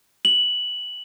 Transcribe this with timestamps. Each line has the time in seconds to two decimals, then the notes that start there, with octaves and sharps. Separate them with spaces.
0.25 F#7